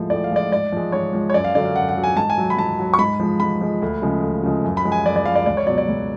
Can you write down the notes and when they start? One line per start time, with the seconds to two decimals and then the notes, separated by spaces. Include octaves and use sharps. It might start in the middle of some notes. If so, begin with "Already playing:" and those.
Already playing: A2 F3 G#3
0.10 A2 D5
0.24 F5
0.31 F3 G#3 D5
0.52 G#2 D5
0.72 F3 G#3
0.92 G#2 C#5
1.13 F3 G#3
1.30 C#5
1.34 F#2 D5
1.44 F5
1.55 D3 F#3 D5
1.65 F5
1.76 F#2 F#5
1.89 F#5
1.96 D3 F#3
2.04 G#5
2.16 G#2 A5
2.30 G#5
2.38 F#3
2.50 B5
2.57 G#2 A5
2.79 F#3
2.94 C#6
2.99 G#2 B5
3.20 F3 G#3
3.40 G#2 B5
3.61 F3 G#3
3.82 D2
4.02 C#3 F3 G#3
4.23 D2
4.43 C#3 F3 G#3
4.64 F#2
4.77 B5
4.84 F3 G#3
4.92 G#5
5.05 F#2 D5
5.16 D5
5.25 F3 G#3 F5
5.35 D5
5.46 C#2 D5
5.57 C#5
5.67 B2 F#3 D5
5.78 D5
5.88 C#2